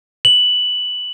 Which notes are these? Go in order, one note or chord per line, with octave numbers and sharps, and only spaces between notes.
F#7